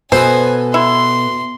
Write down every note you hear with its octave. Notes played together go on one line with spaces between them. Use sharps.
B2 A4 B4 C5 D#5 G#5
E4 C6